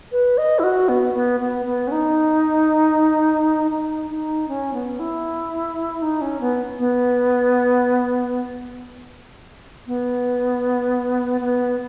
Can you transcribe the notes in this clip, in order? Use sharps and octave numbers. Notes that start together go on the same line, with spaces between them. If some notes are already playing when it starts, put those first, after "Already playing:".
B4
D#5
E4
F#4
B3
B3
B3
B3
C#4
D#4
D#4
D#4
C#4
B3
E4
D#4
C#4
B3
B3
B3
B3